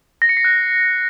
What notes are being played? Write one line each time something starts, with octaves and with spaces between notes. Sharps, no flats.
A#6
C#7
C7
F#6